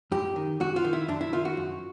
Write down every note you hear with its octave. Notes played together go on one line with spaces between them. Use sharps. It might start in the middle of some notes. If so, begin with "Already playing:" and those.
F#2 G4
D#3
F#2 F#4
F4
D#3
E4
F#2 D4
E4
D#3 F4
F#4
F#2